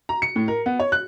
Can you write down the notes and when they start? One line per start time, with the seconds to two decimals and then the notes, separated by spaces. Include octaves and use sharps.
0.09 A#5
0.22 C#7
0.36 A2
0.48 A#4
0.66 B3
0.80 C#5
0.92 F#6